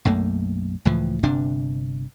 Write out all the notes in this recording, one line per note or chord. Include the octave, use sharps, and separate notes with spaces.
B1 F#2 A3 A#3
C#2 A2 E3 F3
G1 G2 C3 D4